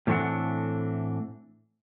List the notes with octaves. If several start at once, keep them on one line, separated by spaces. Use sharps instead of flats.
A2 E3 A3 C4 D4 F#5